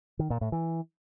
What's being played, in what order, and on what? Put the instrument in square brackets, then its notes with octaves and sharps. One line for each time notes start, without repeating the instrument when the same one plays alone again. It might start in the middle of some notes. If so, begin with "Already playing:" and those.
[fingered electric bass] D#3
A#2
A2
E3